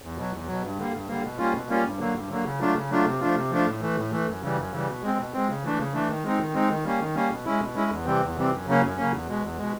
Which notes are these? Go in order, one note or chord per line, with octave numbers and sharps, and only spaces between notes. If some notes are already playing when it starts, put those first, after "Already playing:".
E2
B2 F#3
E2
B2 F#3
G2
D3 G3 A#3
G2
D3 G3 A#3
B2
G3 A#3 C#4 F4
B2
G3 A#3 C#4 F4
G2
D3 F#3 A#3
G2
D3 F#3 A#3
C#3
F#3 A3 D4 F4
C#3
F#3 A3 D4 F4
C3
F3 A3 D4 F4
C3
F3 A3 D4 F4
A2
E3 A3
A2
E3 A3
F#2
C#3 E3 G3
F#2
C#3 E3 G3
B2
G#3 C4
B2
G#3 C4
C#3
E3 A3 D4
C#3
E3 A3 D4
D#3
G#3 C4 D#4
D#3
G#3 C4 D#4
D#3
G3 A#3 C#4
D#3
G3 A#3 C#4
B2
G#3 C#4 E4
B2
G#3 C#4 E4
E2
C3 E3 G3 C4
E2
C3 E3 G3 C4
F#2
C#3 F#3 A#3 C#4
F#2
C#3 F#3 A#3 C#4
E2
B2 G#3
E2
B2 G#3